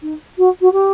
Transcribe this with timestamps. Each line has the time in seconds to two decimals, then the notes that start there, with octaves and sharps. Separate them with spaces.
0.02 D#4
0.38 F#4
0.61 F#4
0.72 G4